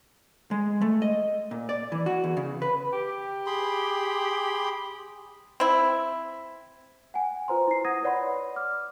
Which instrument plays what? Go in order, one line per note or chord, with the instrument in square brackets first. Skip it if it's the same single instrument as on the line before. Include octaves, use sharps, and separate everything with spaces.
[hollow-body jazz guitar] G#3
A3
D#5
A#2
D5
E3
F#4
E2
C#3
B4
[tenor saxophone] G4
[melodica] G#4 B5 C6
[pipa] C4 E4
[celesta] F#5 G#5
F4 B4 C5 A#5 C6
E4 C7
F#5 D#6 G#6 A#6 D#7
B4 C#5 D5 F#5 B5 C6
D6 F6